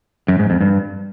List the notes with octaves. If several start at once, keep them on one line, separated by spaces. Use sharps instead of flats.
F#2
G#2
F2
G2